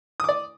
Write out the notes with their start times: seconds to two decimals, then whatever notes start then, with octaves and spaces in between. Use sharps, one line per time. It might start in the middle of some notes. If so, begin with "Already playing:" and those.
0.20 D#6
0.24 D6
0.29 D5